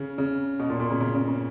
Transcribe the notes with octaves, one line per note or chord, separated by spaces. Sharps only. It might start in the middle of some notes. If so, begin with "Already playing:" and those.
Already playing: C#3
C#3
B2
A#2
A#2
C#3
C#3
C#3
C#3